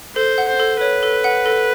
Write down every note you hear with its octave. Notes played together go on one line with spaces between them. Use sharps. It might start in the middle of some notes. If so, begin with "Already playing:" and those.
A4 C5
F#5
C5
A4
B4 C#5
A4
F#5
A4